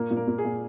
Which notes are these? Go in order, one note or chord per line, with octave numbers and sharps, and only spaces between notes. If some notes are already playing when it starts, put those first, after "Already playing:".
Already playing: A#2 A#3 A#4
A#2
A#3 A#4
A#2
G#4
A#2